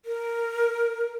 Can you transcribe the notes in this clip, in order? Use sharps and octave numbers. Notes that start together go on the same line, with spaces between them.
A#4